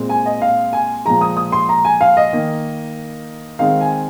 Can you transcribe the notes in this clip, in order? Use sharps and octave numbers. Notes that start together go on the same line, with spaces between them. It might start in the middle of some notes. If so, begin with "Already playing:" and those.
Already playing: A#2 G#3 C4
G#5
D#5
F5
G#5
A#2 F3 G#3 A#5
D#6
D#6
C6
A#5
G#5
F5
D#5
D#3 A#3
D#3 G#3 C4 F5
G#5